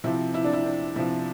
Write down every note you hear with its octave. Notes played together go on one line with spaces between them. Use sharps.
C3 F3 E4
E4
D4
E4
D4
C3 F3 E4